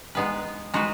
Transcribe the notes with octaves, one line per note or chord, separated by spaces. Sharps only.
G#3 B3 D#4 G#4 B4
G#3 D#4 F#4 B4